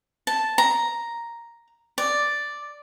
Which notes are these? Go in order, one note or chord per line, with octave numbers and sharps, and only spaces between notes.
A5
A#5
D5